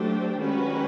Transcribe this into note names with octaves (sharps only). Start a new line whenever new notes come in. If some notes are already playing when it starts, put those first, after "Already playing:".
Already playing: F#3 A3 D4 G4 C5
D#3 G#3 C#4 F#4 B4